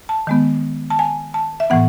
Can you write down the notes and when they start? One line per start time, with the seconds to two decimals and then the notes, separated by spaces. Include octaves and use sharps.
0.09 A5
0.27 D#3 G#3 B3
0.90 A5
0.99 G#5
1.34 A5
1.60 E5
1.70 A2 E3 B3 F#5